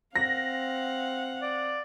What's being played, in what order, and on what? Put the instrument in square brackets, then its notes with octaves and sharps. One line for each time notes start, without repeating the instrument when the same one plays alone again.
[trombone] C4 [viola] F5 F#5 [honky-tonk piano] A#6
[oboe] D5